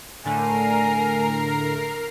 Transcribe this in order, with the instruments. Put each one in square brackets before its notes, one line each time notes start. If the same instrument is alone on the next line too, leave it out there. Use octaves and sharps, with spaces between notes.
[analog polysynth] A2 D3 A3 [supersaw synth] A#4 A#5 C7 [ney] G#5